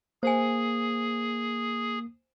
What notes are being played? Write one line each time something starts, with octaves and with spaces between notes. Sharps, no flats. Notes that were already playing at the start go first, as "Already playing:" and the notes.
A#3 G#4 C5 G#5